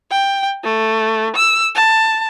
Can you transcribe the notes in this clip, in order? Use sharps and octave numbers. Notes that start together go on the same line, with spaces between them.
G5
A3
E6
A5